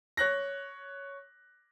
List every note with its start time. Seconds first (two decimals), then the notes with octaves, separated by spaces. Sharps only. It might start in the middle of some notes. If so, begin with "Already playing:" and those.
0.17 C#5 F#6 A#6